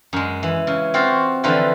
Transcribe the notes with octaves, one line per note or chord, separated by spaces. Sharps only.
F#2 G#3
E3
C#3
C4 F4 F#4 C5
D3 E3 F3 F4 B4 G5